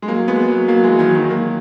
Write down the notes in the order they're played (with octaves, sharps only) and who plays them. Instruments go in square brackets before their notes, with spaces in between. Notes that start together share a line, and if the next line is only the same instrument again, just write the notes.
[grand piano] G#3
F#3 A#3
G#3 B3
F#3 A#3
F#3 A#3
E3 G#3
D#3 F#3
D#3 F#3
F#3 A#3